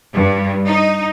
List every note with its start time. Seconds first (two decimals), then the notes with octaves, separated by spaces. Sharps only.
0.13 G2
0.66 D#4